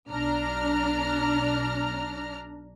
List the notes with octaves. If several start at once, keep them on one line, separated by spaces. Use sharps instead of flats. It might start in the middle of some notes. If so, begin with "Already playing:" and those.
B1 D4 A#5 F6